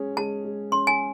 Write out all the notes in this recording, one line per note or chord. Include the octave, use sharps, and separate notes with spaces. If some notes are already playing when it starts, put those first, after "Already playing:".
Already playing: G#3 C#4 G#4
G#3 A5
G#3
C#4 C6
G#5